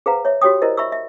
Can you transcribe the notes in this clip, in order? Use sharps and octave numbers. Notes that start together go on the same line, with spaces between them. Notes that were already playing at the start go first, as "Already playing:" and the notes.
G#4 B4 C5 F5 F#5 A#5
C#5 E5
F#4 G4 C#5 G5 D#6
E4 A#4 C5 D5 D#5
E5 B5 C#6 E6
E5